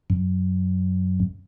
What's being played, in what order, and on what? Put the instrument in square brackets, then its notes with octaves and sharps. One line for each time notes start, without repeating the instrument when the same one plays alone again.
[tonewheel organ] F#2